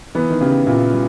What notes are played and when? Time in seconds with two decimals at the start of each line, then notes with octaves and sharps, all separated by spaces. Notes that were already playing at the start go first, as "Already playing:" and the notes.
0.15 E3 B3
0.30 D#3
0.41 C#3 G4
0.66 A#2 E4
0.92 G3